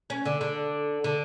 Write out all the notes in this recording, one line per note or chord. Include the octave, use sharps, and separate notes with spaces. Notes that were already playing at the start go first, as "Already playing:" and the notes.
C#4
D3
D3
D3